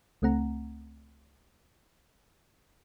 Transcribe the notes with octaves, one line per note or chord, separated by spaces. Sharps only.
C#2 A3 C4 F#5 A#5